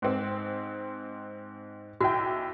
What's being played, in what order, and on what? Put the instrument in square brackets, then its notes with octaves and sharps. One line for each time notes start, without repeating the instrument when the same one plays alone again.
[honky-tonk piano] G#2 C4
[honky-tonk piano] B1 E4 G5 [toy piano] F#4